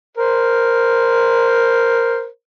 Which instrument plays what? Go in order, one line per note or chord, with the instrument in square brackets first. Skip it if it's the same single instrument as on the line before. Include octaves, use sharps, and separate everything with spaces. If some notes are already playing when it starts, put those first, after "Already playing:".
[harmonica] A#4 C5